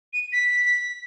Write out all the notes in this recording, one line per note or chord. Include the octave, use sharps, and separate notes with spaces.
D#7
B6